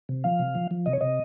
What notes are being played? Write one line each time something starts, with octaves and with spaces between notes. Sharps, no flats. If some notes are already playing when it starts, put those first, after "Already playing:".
C3
F3 F5
C3
F3
F3
C3 D#5
C#5
C3 D#5